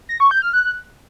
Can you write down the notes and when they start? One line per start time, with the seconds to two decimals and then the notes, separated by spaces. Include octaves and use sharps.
0.09 A#6
0.20 C#6
0.31 G6
0.42 F6
0.53 F#6